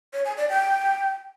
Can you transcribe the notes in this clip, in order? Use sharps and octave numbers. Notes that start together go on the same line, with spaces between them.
C#5
G#5
D5
G5